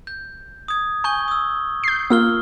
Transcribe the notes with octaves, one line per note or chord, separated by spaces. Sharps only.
G6
D#6 G#6
G#5 C#6 G6 G7
D#6 E6
G6 C7
A#3 F4 E6 F6 G7